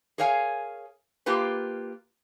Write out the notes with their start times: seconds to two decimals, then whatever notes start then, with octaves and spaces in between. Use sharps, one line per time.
0.18 G#4 A#4 C#5 F5 F#5 G#5
1.26 A#3 F4 G4 B4